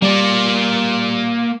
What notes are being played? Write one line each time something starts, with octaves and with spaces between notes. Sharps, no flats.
G3 A#3 D5